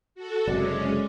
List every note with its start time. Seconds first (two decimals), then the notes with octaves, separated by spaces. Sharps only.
0.15 F#4 A4
0.47 F#1 C3 G#3 C#4 D5